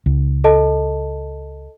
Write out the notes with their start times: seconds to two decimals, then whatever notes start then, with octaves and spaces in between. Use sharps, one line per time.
0.06 C#2
0.44 A4 D#5 A5